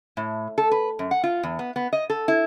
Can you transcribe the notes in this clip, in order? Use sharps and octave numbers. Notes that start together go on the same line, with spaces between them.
A2
A4
B4
F#2
F#5
F4
E2
B3
B3
D#5
A4
E4